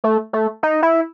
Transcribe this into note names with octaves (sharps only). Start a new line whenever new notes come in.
A3
A3
D#4
E4